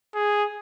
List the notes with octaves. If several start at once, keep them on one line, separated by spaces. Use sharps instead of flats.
G#4